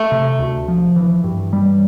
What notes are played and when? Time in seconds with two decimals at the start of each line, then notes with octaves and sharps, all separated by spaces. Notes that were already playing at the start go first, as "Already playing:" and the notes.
Already playing: A3
0.12 C3
0.39 D2
0.68 F3
0.96 E3
1.24 G2
1.53 G3